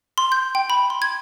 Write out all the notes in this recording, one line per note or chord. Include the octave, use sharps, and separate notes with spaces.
C6
G6
G5
B5
C6
G#6